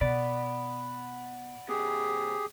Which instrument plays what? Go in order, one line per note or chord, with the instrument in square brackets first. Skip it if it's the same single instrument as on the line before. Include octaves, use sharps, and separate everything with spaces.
[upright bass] B2 [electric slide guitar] D5 [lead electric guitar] F#5 B5
[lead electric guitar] C#3 B3 [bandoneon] G4 G#4